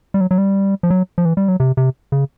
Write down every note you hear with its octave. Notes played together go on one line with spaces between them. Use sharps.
G3
F#3
F#3
G3
F3
F#3
F3
E3
G3
F#3
C3
C3
C#3